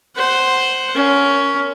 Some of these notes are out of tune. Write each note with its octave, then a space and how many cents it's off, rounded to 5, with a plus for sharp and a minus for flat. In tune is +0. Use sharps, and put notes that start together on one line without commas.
C5 +0 F#5 +15
C#4 +15 A#4 +0